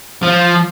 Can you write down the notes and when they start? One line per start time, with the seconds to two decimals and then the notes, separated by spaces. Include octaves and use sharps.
0.23 F3